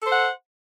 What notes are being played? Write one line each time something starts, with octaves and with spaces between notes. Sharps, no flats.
A4 C5 F#5